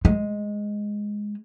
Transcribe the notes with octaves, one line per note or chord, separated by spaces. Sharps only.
G#3